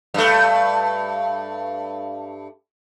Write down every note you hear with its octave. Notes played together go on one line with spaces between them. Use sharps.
G2 A3